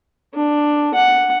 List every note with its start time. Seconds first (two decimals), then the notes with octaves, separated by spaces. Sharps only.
0.34 D4
0.94 F#5